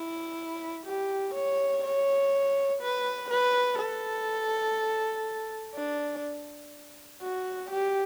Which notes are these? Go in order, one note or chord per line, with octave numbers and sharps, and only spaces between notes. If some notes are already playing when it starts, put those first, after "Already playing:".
Already playing: E4
G4
C#5
C#5
B4
B4
A4
D4
F#4
G4